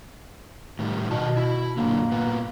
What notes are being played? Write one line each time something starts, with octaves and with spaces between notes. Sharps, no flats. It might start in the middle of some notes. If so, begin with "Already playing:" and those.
A2 D#3 G3
B2 D#3 F#4 A5
E4
F#2 A#2 D3 A#3
A#2 B3